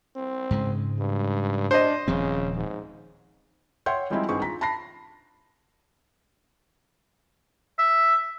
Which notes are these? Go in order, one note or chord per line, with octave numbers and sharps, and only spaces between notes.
C4
G#2 C#3 G#3
G2
D4 C5 D#5
D#1 C#3 F3 C4
G#2
C#5 E5 F#5 G5 C6 G6
F3 G3 G#3 C4 D#4 E4
G1 D#3 C4 G#4 C#6
F4 A#5 B6
A5 B5 A#6 C7
E5